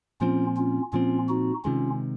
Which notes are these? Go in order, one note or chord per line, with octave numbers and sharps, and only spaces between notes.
A#2 F3 C4 C#4 F4
C#4 F4
A#2 F3 C4 C#4 F4
D#4 F#4
C3 D#3 G#3 C#4 F4